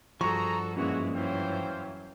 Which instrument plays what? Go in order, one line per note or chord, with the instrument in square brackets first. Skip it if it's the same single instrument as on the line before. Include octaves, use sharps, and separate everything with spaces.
[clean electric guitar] G2 F3 [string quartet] F#4 A4 [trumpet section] G#4 A#5 [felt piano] C#6
[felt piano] F#2 [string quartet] A#2 E3 G#3 [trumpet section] F#4
[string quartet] E3 F#3 [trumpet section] C5 F5 G5